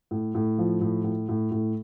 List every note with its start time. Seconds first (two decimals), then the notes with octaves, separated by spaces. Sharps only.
0.11 A2
0.35 A2
0.59 F3
0.81 A2
1.04 A2
1.29 A2
1.51 A2